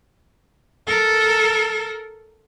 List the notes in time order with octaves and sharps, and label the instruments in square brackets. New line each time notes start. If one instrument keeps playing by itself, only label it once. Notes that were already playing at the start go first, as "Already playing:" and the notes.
[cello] A4 A#4